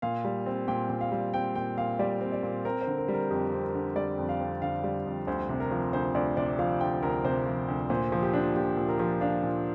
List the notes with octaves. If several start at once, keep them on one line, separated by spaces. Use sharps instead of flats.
A#2 F5
G3
C4
A#2 G5
A#2
F5
G3
C4 G5
A#2 G5
A#2 F5
G3 D5
C4
D5
A#2
C4 A#4
C5
D3
A#4
G3
A#4
F2 G4
C4
A#4
D3
G3 D5
F2
F5
C4
D3 F5
G3
F2
D2 C5
C3
A#4
F3
D2 C5
D2 D5
C3 D5
F3 F5
D2 G5
D2 A#4
C3 C5
F3
D2
A#2 C5
F3
G4
D4
A#2 G4
A#2
A#4
F3
D4 F5
A#2